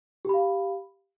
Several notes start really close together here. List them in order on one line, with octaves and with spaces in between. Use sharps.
G4 B5 F5